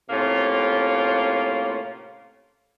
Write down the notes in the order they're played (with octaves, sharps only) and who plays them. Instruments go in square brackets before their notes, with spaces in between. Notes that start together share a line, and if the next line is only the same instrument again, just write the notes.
[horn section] A2 C3 A#3 C#4 F4